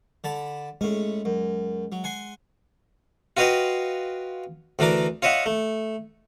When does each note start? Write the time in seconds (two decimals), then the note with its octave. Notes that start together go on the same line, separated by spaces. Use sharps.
0.24 D3 A5 B5
0.81 A2 G#3 C#4
1.25 F#2
1.92 F#3
2.04 F#5 G#5 C6
3.37 F4 F#4 B4 D#5 F5 G5
4.79 D2 E3 D4 A#4 D6
5.22 F4 C#5 D#5 E5 F#5
5.46 A3